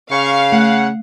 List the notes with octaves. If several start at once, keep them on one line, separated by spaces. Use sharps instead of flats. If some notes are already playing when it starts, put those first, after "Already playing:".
C#3 F5 C#6
A3 F#5